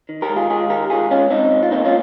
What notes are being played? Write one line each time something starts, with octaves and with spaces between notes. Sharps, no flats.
D#3
G4 A#4
G#3
F4 G#4
G#3 F4 G#4
D#3 G4 A#4
G#2 F4 G#4
G#2 C#4 F4
G#2 C4 D#4
G#2
F4
A#3 C4 D#4
C#4 F4